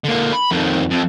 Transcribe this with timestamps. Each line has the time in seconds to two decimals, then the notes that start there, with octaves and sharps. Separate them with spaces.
0.04 D3 A#3
0.33 B5
0.51 F2 D#3
0.90 F2